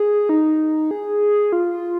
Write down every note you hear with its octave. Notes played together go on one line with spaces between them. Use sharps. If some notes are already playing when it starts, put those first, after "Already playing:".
Already playing: G#4
D#4
G#4
F4